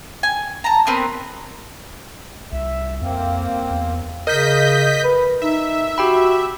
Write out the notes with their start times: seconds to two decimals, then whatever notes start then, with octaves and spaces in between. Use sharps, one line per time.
0.23 G#5
0.64 A5 A#5
0.87 B3 C4 A#4 B4
2.52 C2 E5
3.01 F2 A#3 C4
3.71 E2
4.27 C#3 A#4 D#5 G6 B6
5.04 B4
5.42 D#4 E5
5.98 F#4 G4 G5 B5